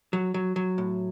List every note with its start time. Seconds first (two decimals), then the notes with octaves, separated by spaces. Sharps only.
0.13 F#3
0.34 F#3
0.56 F#3
0.78 A2